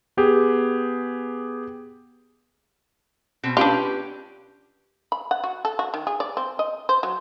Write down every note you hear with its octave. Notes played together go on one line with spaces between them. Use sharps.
B3 G4 G#4
B2 C4
C#4 D4 F4 G4 B4
B5
F#5
F#4
A4
F#4
D#3
G#4
D5
C4
D#5
C5
F#3